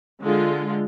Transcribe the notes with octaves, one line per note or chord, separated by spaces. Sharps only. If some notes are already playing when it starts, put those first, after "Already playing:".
D3 G#3 F4